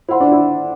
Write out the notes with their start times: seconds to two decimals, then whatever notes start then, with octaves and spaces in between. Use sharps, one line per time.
0.09 E4 C5 F#5 C6
0.20 D4
0.32 E4